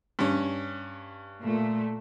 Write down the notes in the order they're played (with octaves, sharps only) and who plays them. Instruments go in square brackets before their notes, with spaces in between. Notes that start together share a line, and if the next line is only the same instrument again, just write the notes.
[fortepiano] G2 C#4
[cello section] A#2 A3